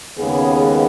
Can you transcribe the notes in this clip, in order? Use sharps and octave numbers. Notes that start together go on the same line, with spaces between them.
D#2 C#3 G#3 B3 G#4